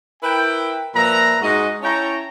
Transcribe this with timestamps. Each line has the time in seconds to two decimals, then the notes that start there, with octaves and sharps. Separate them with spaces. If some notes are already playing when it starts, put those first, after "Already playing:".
0.23 E4 A#4 B4 G5
0.95 A#2 F3 B4 E5 A#5
1.41 G#2 G#3 F#4 D#5
1.82 C#4 E4 C#5 G5 A5 A#5